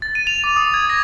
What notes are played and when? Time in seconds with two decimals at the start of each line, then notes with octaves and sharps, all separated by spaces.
0.02 A6
0.15 D#7
0.27 F7
0.44 D6
0.56 D#6
0.74 G#6
0.90 A#6